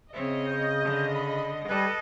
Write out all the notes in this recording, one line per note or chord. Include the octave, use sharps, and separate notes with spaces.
C#3 C4 C#5 D#5 E5
G6
D3
B5
G3 A4 B4 D#5